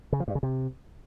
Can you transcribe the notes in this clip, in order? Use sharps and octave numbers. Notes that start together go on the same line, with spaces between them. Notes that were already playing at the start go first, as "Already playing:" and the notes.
C#3
F3
G2
C#3
C3